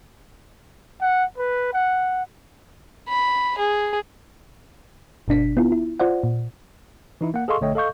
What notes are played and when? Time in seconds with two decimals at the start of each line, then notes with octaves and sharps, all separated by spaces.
1.02 F#5
1.38 B4
1.74 F#5
3.09 B5
3.58 G#4
5.28 G1 B2 D4 B6
5.57 B3 E4 F4
5.72 E4
6.00 F4 C5 D5 F#5
6.24 A#2
7.21 E3 D#4 E4
7.34 A#3 F#5
7.48 G#4 A4 D#5 F5 C6 C#6
7.61 A#1 D3 A3 C#5 D#5 G5
7.75 A4 D#5 F5 C#6 G6